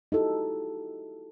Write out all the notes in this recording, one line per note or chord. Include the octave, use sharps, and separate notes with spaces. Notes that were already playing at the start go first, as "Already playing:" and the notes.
D#4 E4 F#4 G4 A4